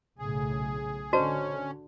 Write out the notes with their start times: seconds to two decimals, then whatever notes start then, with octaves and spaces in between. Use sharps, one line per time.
0.19 B1 A2 C#3 G#4
1.13 D3 C#4 F#4 C5 D5 D#5 A5